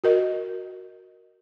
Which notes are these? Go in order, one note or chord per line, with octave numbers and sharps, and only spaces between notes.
F#4 A#4 D#5